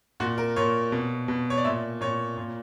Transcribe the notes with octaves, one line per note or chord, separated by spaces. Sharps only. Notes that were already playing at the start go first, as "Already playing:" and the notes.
A#2 F#4
A#4
A#2 C#5
B2
B2
C#5
D5
A#2 E5
A#2 C#5
A#2